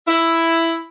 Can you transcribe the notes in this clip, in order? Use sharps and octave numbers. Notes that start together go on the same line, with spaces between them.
E4